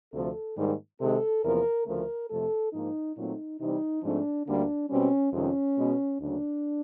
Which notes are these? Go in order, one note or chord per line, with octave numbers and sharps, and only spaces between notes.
D2 C3 F3 A3 A4
G#2 D#3 G3 A#3
C3 D#3 G#3 A4
E2 C3 F3 A#3 A#4
D2 C#3 F3 A3 A#4
F2 C3 F3 A3 A4
G#2 F3 A#3 D#4
A#2 F#3 A3 C4 D#4
C3 E3 G3 C4 D#4
G#2 F3 A3 C4 D4
D2 D3 G3 A#3 D4
B2 G3 C4 C#4
F2 C3 D#3 G#3 C#4
B2 G#3 B3
D2 C#3 F#3 A#3 D4